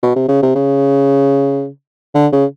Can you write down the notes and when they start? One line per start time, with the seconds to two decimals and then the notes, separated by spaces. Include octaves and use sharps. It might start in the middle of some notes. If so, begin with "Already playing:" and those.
0.03 B2
0.16 C3
0.28 C#3
0.43 C3
0.55 C#3
2.15 D3
2.33 C#3